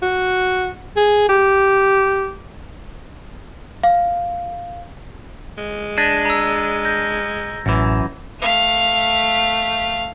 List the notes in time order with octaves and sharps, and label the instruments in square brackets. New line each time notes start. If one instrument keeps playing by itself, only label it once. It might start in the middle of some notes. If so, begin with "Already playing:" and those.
[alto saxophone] F#4
G#4
G4
[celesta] F5
[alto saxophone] G#3
[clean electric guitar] D4 [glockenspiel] G#6 A#6 D#7
[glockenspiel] A#5 E6
G6 A#6
[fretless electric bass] A1 [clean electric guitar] F#2 E3
[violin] A3 F5